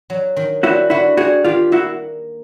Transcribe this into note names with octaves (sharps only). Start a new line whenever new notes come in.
F#3
D#3
G3 E4 F#4
D3 E4 F#4
G3 F#4 G#4
D#3 F4 G4
A#3 E4 F#4